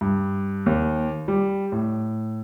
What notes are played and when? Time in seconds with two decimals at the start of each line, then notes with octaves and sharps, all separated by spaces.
0.01 G2
0.66 D#2
1.28 G3
1.72 A2